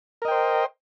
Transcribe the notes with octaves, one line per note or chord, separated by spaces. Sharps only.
A#4 C5 D#5 G5